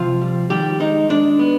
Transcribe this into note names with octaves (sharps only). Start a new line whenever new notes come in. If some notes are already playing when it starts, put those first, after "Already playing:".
Already playing: C3 F3 F4
G3
D#3 G3 G4
G#3 D#4
G#3 D4
B3